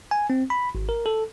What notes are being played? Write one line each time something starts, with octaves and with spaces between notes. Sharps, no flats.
G#5
C4
B5
G#1
A#4
A4